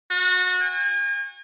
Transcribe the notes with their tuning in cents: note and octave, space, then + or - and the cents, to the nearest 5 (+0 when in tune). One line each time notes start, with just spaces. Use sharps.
F#4 -25
G#5 -40